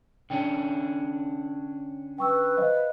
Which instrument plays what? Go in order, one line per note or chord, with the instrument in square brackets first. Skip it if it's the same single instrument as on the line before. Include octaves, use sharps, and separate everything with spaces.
[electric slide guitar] D3 C#4 D4 [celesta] G5
[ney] B4 [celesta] G5 C#6 E6
[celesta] C5 D#5 F5